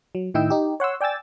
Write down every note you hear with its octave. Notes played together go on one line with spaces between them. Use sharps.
F#3
A2 D#3 E4 D#5 G5 E6
D#4 G4
C#5 F#5 C6 E6
D5 G5 G#5 E6 A6